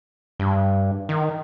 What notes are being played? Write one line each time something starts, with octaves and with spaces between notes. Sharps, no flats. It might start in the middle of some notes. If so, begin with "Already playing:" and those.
G2
D#3